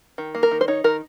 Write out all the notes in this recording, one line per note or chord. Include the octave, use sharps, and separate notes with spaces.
D#3
A#3
A#4
D#3
C5
D#4 C#5
D#3 A#4